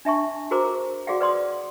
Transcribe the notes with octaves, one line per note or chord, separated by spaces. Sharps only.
D4 E5 A5 C#6
F#4 G#4 A#4 C5 A#5 D6
F#4 G#4 D5 F5 F#5
B4 D5 C6 D#6